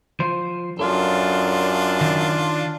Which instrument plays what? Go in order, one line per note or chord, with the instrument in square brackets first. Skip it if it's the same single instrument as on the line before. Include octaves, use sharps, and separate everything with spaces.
[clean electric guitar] F3 C5
[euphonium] F#2 [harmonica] D4 F4 [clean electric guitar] A4 C#5 F5
[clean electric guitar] D#3